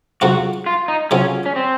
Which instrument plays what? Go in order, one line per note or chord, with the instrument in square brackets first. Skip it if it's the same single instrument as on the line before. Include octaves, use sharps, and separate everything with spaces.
[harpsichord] C#3 F#3 C4 F4 [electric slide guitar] F#4
[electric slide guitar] F4
D#4
[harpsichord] C#3 F#3 C4 F4 [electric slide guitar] C#4
[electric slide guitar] C#4
C4